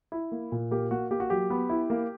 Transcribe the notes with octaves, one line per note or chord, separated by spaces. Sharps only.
E4
A#3
A#2
A#3 G4
A#3 F#4
A#3 G4
F#4
F#3 G4
B3
E4
A#3